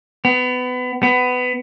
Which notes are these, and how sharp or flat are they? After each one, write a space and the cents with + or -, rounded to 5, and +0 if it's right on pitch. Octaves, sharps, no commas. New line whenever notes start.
B3 +25
B3 +20